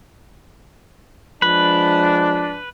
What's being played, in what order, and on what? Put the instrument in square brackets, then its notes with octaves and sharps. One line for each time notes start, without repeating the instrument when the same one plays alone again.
[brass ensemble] F3 G#3 D4 [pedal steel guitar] B4